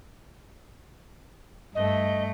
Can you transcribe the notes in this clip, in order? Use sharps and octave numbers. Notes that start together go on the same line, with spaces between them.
G2 A3 D#5